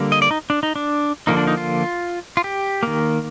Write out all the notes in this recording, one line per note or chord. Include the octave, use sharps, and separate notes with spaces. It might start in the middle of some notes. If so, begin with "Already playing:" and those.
Already playing: D3 G3 A#3
D#5
D5
D#4
D4
D#4
D4
D3 F3 A#3 D#4
D4
D#4
F4
F4
G4
D#3 A#3